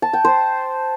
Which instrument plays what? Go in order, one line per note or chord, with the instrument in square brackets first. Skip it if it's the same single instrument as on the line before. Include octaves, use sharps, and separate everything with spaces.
[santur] A5
G5
C5